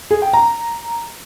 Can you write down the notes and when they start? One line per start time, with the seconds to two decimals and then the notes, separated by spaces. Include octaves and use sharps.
0.11 G#4
0.22 G5
0.33 A#5